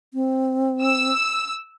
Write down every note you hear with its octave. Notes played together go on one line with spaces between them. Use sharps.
C4
E6